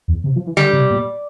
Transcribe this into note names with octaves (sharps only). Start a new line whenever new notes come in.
E2
C3
F3
E3
D3 G3
C3
A#2